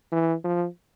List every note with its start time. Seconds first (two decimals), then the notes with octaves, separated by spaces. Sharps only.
0.12 E3
0.44 F3